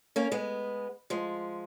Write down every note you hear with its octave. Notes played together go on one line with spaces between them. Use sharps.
A#3 C#4
G#3 B3
F3 G#3